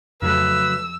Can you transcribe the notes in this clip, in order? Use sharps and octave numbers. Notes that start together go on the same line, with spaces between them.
F2 C#3 F#3 A3 B4 E6